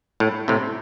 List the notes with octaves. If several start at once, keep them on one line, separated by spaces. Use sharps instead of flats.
A2
A2 C3